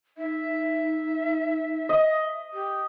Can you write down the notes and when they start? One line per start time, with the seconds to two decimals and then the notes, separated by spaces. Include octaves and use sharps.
0.18 D#4 E5
1.89 D#5
2.54 G4